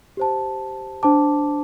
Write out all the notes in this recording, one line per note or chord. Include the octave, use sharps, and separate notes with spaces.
G4 C5 A5
D4 C5 A5 D6